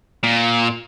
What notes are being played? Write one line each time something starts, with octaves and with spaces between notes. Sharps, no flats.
A#2